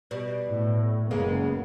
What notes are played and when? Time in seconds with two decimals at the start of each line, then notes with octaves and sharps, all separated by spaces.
0.11 B2 G3
0.49 A2
1.11 F#1 C#3 G#3 A#3 B3